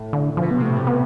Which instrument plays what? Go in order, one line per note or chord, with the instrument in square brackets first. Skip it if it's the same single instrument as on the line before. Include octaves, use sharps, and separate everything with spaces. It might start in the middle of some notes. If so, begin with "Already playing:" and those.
Already playing: [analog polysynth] A2
[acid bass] D3
[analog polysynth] B2 [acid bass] F3
[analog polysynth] C3 [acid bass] B3
[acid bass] A3
[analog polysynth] A2
[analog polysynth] B2 [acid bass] B3